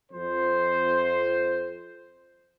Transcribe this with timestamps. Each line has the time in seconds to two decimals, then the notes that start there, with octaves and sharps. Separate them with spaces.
0.12 F2 C5